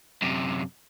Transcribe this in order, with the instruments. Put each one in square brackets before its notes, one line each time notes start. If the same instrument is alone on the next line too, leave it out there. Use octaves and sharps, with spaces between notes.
[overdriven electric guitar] F#2 C3